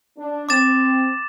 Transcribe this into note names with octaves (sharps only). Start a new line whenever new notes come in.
D4
C4 D6 A6 E7